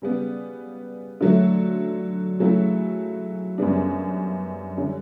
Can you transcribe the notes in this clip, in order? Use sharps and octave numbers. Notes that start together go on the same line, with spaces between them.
C#3 G3 B3
D3 F#3 A3
C#3 F#3 A3 E4
F#2 C#3 G3 B3 D4
D3 G3 C#4